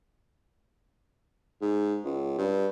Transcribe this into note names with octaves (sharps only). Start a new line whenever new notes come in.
G#2
C#2
G2